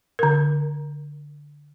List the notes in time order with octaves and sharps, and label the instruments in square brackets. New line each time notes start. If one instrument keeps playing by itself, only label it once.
[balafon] D3 A#4